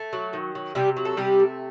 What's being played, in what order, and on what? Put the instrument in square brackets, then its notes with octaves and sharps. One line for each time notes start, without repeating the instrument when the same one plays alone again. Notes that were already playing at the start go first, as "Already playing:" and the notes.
Already playing: [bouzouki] A3
F#3
D#3
F#3
C3 G3 G4
F#3
A4
C3 G3 G4
A3